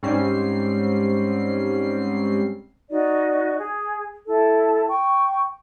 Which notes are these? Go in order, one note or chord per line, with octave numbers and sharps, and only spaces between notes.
G#2 G3 C4 C#4 C7
D#4 F#4 D5
G#4
E4 A4
G5 C#6